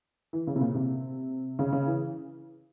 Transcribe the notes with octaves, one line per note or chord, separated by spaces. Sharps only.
E3
C#3
C3
A#2
C3
C#3
C#3
E3